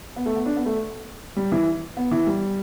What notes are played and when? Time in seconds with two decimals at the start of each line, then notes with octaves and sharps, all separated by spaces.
0.16 B3
0.26 A3
0.36 B3
0.46 D4
0.56 B3
0.66 A3
1.36 G3
1.52 E3
1.97 B3
2.11 E3
2.27 G3